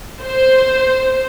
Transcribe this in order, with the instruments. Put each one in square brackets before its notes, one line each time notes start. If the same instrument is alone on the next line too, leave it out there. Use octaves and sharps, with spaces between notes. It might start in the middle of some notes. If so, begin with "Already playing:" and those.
[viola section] C5